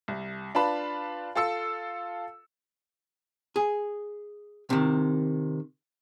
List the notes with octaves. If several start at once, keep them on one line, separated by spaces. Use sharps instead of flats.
C2
D4 F4 B4 A5 B5
F4 A4 E6 C#7
G#4
C3 D#3